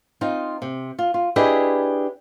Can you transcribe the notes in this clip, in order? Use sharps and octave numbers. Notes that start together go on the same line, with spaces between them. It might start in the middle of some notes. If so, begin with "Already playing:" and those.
C4 D#4 F4
C3
F4
F4
D4 E4 G4 G#4 B4 D#5